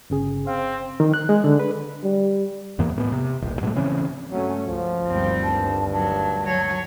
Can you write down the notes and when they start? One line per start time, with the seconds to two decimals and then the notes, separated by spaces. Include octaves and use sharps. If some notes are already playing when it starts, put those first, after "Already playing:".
0.10 G1 C#3 G#4
0.47 C4 F5
1.00 D#3
1.14 F#6
1.29 G#3
1.44 D3
1.60 B4
2.03 G3
2.78 E2 G#2 E3 A#3
2.96 A2 A#3 B3
3.12 C3
3.42 D1 A#1
3.61 G#2 B2 G3 A3
3.75 C#3 E3 C4 C#4
4.32 G2 F#3 A3 C#4
4.66 C#2 F3
5.07 G1 D2 D#3 G3 C4
5.44 G2 A5
5.93 F#3 A5
6.44 F#3 C#5